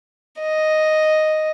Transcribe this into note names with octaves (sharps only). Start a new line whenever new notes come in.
D#5